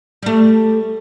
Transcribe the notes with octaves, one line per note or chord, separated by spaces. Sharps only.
G3 A3